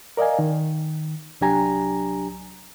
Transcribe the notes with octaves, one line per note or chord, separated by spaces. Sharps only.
A#4 D5 D#5 F5 G#5
D#3
C2 F#3 D4 G4 G#5 A#5